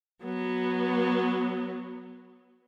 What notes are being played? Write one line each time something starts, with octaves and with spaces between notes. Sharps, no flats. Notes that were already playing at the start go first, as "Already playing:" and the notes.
F#3 B3